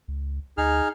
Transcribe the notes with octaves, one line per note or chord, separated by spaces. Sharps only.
C#2
D2 D#4 G#4 F6